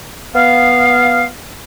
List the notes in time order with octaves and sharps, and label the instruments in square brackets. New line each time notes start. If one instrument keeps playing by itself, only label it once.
[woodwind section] B3 F5